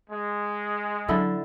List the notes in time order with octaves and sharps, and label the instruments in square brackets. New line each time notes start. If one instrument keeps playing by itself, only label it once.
[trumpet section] G#3
[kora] D3 E4 A4 [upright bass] F#3